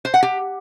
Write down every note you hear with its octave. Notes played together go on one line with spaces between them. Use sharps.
C5
F#5
G4